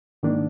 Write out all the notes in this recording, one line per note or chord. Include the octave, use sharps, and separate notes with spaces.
G#2 D#3 A#3 D4